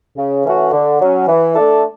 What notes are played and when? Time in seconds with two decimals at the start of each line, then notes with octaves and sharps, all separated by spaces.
0.17 C#3
0.45 E3 A3 C#4 F#4
0.72 D3
1.00 F#3 C#4
1.28 E3
1.55 A3 D4 A4